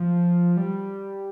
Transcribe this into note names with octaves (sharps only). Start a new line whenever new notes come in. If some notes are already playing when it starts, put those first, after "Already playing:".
Already playing: F3
G3